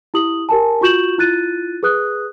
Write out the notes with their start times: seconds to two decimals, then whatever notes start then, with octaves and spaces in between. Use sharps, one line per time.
0.14 E4 G4 D#6 F#7
0.49 G4 A#4 G#5 A5
0.81 F4 F#4 C#6 G6 E7 F#7
1.18 E4 F4 F#6 A6 D#7
1.83 G#4 B4 D#6 F#6